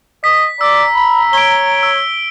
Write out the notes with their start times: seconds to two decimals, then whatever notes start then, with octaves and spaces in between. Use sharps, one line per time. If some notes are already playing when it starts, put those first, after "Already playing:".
0.24 D#5 B6
0.61 D5 A#5 E6
0.94 B5
1.33 C#5 D7 G7
1.83 E6